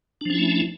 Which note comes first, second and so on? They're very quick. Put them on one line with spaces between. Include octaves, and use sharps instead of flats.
D4 F3 C#4 E4 A3